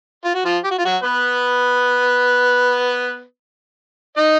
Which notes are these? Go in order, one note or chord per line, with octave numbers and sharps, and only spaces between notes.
F4
F#4
F3 F4
G4
F#4
F4
F#3 F#4
B3 B4
D#4 D#5